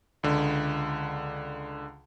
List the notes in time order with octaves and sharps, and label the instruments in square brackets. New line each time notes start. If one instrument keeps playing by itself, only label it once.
[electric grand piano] C#2 D3